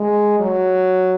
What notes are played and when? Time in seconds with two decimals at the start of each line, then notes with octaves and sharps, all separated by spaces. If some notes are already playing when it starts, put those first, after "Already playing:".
Already playing: G#3
0.40 F#3